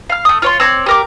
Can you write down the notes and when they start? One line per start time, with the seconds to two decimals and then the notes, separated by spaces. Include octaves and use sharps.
0.10 F5 F6
0.25 A3 D#6
0.42 F4 C#5 C6
0.60 C4 C#5 D5
0.86 G4 A#4 D6